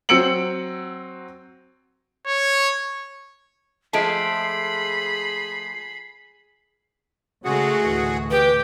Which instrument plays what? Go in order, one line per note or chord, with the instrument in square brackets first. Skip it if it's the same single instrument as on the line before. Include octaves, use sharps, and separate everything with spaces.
[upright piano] F#3 C4 E6 C#7 D7 F#7
[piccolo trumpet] C#5
[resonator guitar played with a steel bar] F3 G#3 A3 [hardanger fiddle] G#4 B5 [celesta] A5 D7 [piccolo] C7
[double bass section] C#3 [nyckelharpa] G#3 A3 [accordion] F#4 G#4 F#5
[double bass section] D2 A2 E3
[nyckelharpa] G4 G5 [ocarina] B4